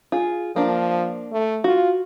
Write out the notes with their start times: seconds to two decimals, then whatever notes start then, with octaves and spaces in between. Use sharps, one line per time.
0.12 F4 G#4
0.56 F3 A#3 D4
1.32 A3
1.64 F4 F#4